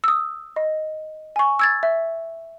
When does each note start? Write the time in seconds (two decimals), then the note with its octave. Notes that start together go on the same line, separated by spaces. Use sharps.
0.04 D#6 E6
0.56 D#5
1.36 G#5 C#6
1.59 E6 G#6 A6
1.83 E5